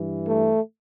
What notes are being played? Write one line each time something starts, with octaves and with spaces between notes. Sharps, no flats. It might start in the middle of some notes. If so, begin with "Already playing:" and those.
Already playing: G2 E3
A3